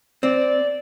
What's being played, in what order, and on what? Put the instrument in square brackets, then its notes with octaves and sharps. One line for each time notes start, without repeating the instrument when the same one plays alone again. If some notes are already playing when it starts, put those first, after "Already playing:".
[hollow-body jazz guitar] C4 [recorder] D5